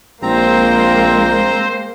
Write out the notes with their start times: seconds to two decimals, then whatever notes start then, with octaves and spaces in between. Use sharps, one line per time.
0.22 A#1 G#3 A#3 C4 C5 A#5